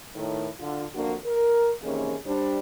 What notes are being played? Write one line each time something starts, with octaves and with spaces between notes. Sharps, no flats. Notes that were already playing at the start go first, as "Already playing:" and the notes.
A2 D#3
D3 F4
F2 D3 F3 A#3 D4 F#4
A#4
C3 D#3 E3 A#3 C#4 G#4
G3 D4 C5